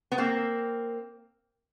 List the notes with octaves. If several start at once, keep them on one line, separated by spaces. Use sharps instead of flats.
B3
A#3 C4